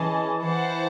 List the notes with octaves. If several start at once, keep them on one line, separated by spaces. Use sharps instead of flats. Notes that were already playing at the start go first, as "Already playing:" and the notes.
Already playing: E3 C#4 G#4 D#5 A5
E3 E4 C5 F#5 A5